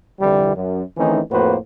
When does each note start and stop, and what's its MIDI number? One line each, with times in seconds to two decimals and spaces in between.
0.20 0.51 36
0.20 0.51 41
0.20 0.51 50
0.20 0.51 52
0.20 0.51 55
0.55 0.82 42
0.97 1.21 51
0.97 1.21 52
0.97 1.21 57
0.97 1.21 60
0.97 1.21 61
0.97 1.21 63
1.31 1.55 41
1.31 1.55 45
1.31 1.55 58
1.31 1.55 66
1.31 1.55 71
1.31 1.55 72